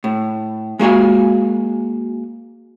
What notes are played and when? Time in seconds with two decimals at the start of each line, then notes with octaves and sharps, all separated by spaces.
0.04 A2
0.79 G#3 A#3 F#4 G#5